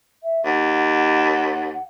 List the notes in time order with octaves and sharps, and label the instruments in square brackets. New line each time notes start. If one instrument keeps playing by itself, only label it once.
[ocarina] E5
[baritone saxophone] D#2 [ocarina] F#5